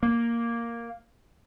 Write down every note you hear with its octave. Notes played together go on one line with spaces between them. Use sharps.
A#3